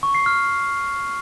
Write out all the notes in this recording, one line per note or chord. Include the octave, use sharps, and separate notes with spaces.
C#6
C7
F6